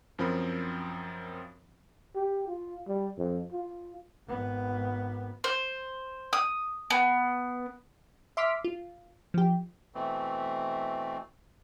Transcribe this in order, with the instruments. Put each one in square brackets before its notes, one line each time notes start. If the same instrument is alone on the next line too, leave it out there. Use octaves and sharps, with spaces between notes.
[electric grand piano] F#2 F3 C4 A#4 B5
[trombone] G4
F4
G3
F2
F4
[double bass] G#1 B3
[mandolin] C5
D#6
B3
[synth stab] E5 C6 D6 F6 B6
F4
F3 G4
[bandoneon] B2 E3 A3 C4